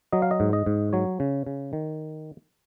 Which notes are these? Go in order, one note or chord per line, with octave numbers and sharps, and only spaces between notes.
F#3 D#5
F5
D#5
G#2
D#5
G#2
F#3 C#5
C#3
C#3
D#3